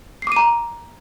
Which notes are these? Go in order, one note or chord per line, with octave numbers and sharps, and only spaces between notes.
A#5 D6 C7 D#7